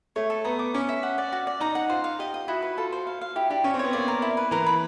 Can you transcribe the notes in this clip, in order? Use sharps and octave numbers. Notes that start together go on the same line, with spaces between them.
A3 C#5
A4
B3 A#5
D6
C#4 D6
E5
F#5
D5
F#4
D5
D#4 A#5
F#5
F4 C5
F5
G4 D#5
D#5
E4 F#4
B4
F4 A4
C5
F5
F5
E4 G4
D4 G4
C#4 C#5
C4
B3 C#5
A#3 D5
A#4
E4
B4
E3 A#4
B5